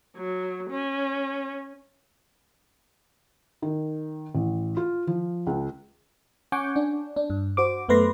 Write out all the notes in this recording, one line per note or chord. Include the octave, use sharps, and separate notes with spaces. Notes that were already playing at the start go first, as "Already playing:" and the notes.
F#3
C#4
D#3
A1
F4
F3
C#2
C#4 F#5 G#5 C#6 D6 G6
D4
D4
G2
F#4 C5 D6
F#2 A3 B3 B4 C6 A#6